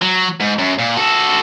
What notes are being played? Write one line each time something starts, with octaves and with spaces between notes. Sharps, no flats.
F#3
G#2
F#2
A#2
F#4 A4